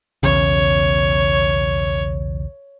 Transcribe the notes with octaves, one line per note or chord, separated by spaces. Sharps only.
B1 E2 C#3 C#5